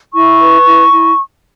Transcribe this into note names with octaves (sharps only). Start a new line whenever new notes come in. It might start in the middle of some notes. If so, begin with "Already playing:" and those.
E4 C#6
B4
E4
E4